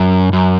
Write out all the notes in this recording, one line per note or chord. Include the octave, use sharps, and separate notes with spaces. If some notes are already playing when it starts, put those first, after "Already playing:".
Already playing: F#2
F#2